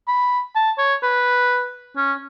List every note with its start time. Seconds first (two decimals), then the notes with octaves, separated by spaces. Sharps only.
0.08 B5
0.55 A5
0.78 C#5
1.03 B4
1.97 C#4